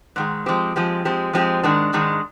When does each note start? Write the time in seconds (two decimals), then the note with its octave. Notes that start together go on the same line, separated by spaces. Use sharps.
0.16 G#2 D#3 G#3
0.46 F3 G#3 C4 G4
0.76 F3 G#3 C4 G4
1.05 F3 G#3 C4 G4
1.33 F3 G#3 C4 G4
1.63 G#2 D#3 G#3 D4
1.93 G#2 D#3 G#3 D4